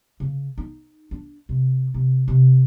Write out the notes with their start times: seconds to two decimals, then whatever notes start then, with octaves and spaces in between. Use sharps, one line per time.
0.20 C#3
0.58 D#4
1.11 D4
1.49 C3
1.94 C3
2.28 C3